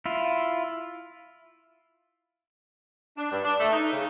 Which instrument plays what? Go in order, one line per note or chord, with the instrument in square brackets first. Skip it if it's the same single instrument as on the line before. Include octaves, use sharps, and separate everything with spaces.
[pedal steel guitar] E4 F4
[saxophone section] D4
G2
D4
A3
D#4
C#3